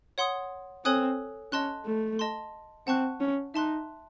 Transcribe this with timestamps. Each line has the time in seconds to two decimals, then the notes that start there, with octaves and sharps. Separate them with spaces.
0.18 C#5 F#5 C6 D#6
0.85 C4 A4 C#5 G#5 D#6 F#6
1.52 C#4 D#5 A5 C6 F#6
1.86 A3
2.19 D#5 A5 C6
2.87 C4 F#5 A5 C#6 F#6
3.20 C#4
3.54 D#4 E5 A5 C6 F#6